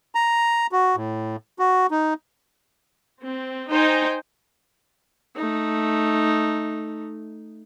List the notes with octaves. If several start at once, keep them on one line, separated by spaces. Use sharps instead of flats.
A#5
F#4
A2
F#4
D#4
C4
D#4 C5 G5 G#5
A3 D#4